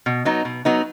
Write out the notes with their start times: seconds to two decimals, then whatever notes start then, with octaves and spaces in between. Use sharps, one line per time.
0.06 B2
0.25 F#3 B3 D#4
0.45 B2
0.65 F#3 B3 D#4